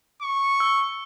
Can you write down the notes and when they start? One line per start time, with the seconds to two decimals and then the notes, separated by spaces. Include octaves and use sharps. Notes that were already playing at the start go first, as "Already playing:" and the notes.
0.22 C#6
0.60 E6